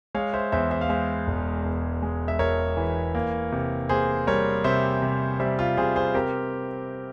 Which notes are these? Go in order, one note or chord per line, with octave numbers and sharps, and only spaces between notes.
G#3 C#5 F5
C5 E5
E2 C5 E5
C5 E5
F5
G#3 C5 E5
E1
E2
G#3
E5
E1 A#4 C#5
E3
A#3
C3
A#3 G#4 C5
G3 A#4 C#5
C3 C5 E5
C3
G3 C5 E5
F4
C3 G#4 C5
G#4 C5
C4 G4 A#4